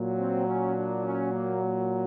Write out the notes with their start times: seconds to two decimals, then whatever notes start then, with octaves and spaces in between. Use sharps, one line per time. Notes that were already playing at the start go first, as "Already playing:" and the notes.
Already playing: A#2 F#3
0.18 C4
0.47 C#4
0.75 D4
1.05 C#4
1.33 A#3